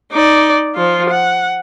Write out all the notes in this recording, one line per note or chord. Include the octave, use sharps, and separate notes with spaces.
D#4 D5
F3 F4
F#5